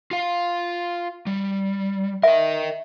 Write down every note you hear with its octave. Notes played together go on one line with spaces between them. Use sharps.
F4 F5
G3
A#4 D#5 E5